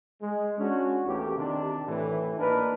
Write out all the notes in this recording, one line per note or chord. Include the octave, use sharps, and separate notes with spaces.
G#3
C#4 D4 F#4
A1 E2 A2 A#3 G4
C3 D#3 D4
A2 E3
A#3 D4 D#4 G4 A#4 B4